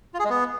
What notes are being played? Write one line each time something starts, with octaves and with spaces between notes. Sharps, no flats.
F4
G#4
G#3
B3